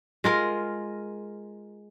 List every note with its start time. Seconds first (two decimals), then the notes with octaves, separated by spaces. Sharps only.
0.24 G#3 F4 A#4